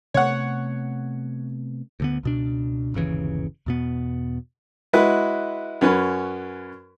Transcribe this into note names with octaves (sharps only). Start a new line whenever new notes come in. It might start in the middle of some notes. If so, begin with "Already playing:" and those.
C3 A3 B3 C#5 F#5
D2 D3 B3
C#2 B2 D4
G1 D#2 C#3 E3
E2 B2 B3
G#3 E4 F#4 B4
F#2 C#4 B4